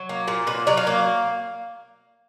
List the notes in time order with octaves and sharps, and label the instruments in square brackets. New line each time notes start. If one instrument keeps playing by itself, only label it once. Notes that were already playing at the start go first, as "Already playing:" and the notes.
Already playing: [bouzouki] F#3
A#3
A#2
A#2 B4
F#3 D5
F5
A#3